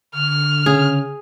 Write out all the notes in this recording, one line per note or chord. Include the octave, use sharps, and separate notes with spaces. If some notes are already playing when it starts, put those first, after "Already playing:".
D3 F6
C#3 G#4